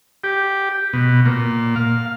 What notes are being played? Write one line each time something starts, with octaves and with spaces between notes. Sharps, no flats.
G4
B2
A#2
F5